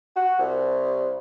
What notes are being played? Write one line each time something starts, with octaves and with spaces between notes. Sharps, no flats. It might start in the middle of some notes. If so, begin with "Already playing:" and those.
F#4
C2